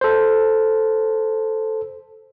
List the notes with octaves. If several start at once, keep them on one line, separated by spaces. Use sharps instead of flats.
A4 C5